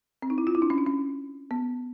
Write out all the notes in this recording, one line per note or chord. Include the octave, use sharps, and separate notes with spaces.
C4
D#4
E4
F4
E4
D4
C#4
D4
C#4
B3